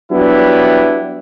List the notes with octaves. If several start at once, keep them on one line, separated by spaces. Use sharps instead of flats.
F#3 G3 B3 D4 E4